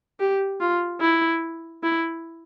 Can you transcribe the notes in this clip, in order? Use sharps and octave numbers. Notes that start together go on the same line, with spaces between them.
G4
F4
E4
E4